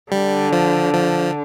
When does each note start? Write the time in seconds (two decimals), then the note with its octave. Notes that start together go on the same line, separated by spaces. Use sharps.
0.12 D3 G3
0.53 F3
0.94 F3